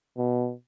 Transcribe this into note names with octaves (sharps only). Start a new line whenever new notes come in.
B2